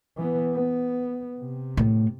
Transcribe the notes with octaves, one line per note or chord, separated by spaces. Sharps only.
E3 B3
B3
C3
A2